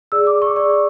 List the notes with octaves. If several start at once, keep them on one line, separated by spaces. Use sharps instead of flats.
G#4 D5 E6
D6
C#6
G#4 D5 C#6